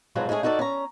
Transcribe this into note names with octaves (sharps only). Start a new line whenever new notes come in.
G#2 B2 F3 F#3 G#3
G#3 A3 C#4 E4 G#4
D#4 F#4 A4 C#5 D5
C#4 A#5